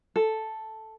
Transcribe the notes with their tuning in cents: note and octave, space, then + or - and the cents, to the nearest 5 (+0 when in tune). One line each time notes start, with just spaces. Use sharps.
A4 +0